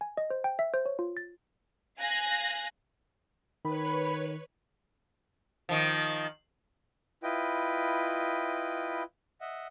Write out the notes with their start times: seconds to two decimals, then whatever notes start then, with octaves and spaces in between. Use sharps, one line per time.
0.01 G#5
0.17 D#5
0.30 C5
0.44 G5
0.59 E5
0.74 C5
0.86 C#5
0.99 F4
1.17 A6
1.98 F5 G#5 F#6 A#6
3.65 D#3 B4 C#5 B5
5.69 D#3 F3
7.23 E4 F4 B4 D#5 G5
9.41 D#5 E5 F#5